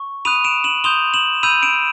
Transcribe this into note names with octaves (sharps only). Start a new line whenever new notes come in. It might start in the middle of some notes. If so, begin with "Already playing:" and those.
Already playing: C#6
B5 D#6 F#6 D#7 F7
D7 E7
E7 F#7
C6 D#6 G6 F7 G7
E7 F#7
B5 E6 G6 D#7 F7
D7 E7